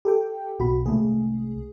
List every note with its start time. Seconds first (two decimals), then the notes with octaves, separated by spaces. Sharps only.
0.05 G4 A4 G5
0.60 B1 B2 F#4 B5
0.86 C2 G#3 A3 G#4